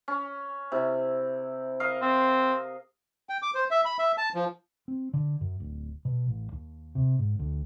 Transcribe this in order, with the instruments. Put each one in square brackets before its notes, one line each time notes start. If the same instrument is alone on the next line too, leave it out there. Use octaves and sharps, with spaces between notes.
[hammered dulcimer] C#4
C3 E4
A#4 D#5 F5
[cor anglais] C4
[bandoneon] G5
D6
C5
E5
B5
E5
A5
F3
[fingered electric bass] C4
D3
F#2
D1
B2
A1
D#2
C3
G#2
D2